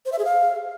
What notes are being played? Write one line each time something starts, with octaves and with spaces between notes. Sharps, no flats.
C5
E5
G#4
F5